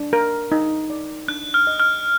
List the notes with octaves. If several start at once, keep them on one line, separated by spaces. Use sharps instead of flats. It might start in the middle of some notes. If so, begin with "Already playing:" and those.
Already playing: D4
A#4
D#4
D5
D4 F#6
F6
D#5
F6